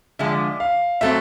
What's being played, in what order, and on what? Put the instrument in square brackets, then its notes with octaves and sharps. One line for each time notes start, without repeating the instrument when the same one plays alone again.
[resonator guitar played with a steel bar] D3 F3 G#3 [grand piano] E5
[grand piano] F5
[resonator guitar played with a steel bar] B2 F#3 A3 C4 [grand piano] E5